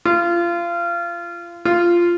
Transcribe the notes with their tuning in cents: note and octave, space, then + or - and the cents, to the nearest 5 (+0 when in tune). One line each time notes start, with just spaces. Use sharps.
F4 -25
F4 -10